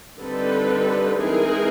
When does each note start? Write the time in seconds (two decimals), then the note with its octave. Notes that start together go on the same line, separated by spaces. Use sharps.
0.19 D3 G3 C4 D#4 A4 B4
1.18 E3 G#3 C4 D#4 G#4 A#4